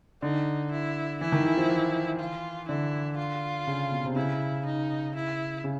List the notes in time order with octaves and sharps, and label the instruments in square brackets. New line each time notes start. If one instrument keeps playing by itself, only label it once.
[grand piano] D3 [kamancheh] D#4
[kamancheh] E4
[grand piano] E3 [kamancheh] E4
[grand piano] D#3
E3
F3
E3
[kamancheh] F4
[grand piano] D3 [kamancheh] E4
[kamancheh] F4
[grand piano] C#3
B2
C3
[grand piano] C#3 [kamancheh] E4
[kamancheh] D#4
E4
[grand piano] C#3